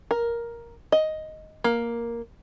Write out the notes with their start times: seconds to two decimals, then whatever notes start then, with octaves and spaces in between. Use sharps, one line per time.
0.11 A#4
0.92 D#5
1.64 A#3